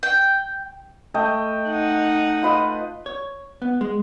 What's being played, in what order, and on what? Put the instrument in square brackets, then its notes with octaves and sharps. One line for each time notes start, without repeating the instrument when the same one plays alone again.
[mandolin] G5
[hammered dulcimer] A3 D#5 G5
[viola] D#4 F#5
[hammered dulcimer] F4 B4 D#5
[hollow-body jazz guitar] C#5
B3
G#3